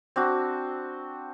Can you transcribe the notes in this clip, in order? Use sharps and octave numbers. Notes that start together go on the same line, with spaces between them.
C4 D4 F#4